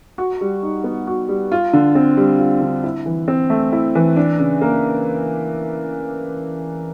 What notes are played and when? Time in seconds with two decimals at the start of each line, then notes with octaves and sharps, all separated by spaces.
0.18 F#4
0.41 G3
0.63 D#4
0.84 B3
1.07 F#4
1.29 G3
1.52 F4
1.73 D3
1.95 C4
2.17 G3
2.39 F4
2.61 D3
2.84 E4
3.06 E3
3.28 C4
3.50 A3
3.72 E4
3.95 E3
4.16 D4
4.39 C#3
4.61 A#3